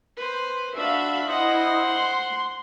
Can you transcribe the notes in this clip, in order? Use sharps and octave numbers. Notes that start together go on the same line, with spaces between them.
B4 C5
D4 F#4 E5 F5 B5
E4 C5 D#5 F#5
C6